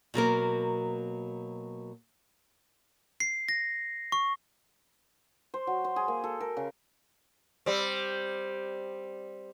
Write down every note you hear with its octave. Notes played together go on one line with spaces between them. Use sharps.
B2 F#3 A#3 A#4
C7
A#6
C#6
C5
F#3
C5
G#4
A#3
A4
A#4
C#3
G3 C4